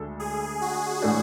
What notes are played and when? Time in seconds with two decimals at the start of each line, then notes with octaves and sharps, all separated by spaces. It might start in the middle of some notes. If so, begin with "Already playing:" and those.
Already playing: D2 D3 G#3 D4 A4
0.20 G#4
0.61 F#4
1.02 A2 E3 A3 D4